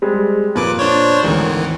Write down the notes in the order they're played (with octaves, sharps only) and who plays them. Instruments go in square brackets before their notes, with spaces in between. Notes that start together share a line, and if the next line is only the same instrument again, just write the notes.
[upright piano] G3 G#3 C4
[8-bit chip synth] F2 B4 D6 [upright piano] A#2
[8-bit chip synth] D4 C5 C#5
[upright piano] G#1 D#3 [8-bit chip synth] D2 E3